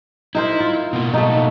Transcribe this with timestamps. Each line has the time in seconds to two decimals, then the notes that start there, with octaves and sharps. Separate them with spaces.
0.35 D#4 E4 A#4 C5
0.60 F4
0.93 B2 A#3
1.14 A3 D#4